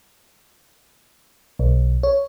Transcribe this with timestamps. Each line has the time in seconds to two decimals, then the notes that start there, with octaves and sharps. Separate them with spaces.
1.59 B1
2.03 C#5